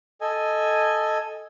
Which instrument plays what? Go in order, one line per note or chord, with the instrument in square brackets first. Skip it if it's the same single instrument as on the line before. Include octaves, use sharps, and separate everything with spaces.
[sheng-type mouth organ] A4 D#5 G#5